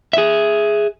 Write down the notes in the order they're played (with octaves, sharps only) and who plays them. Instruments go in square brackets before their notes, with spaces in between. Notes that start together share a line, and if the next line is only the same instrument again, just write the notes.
[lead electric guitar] G#4 E5